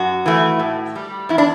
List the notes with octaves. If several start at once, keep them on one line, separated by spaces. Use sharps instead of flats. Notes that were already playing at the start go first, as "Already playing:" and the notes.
Already playing: F#2 F#4
E3 A3
A2
G3
E2 E4
D4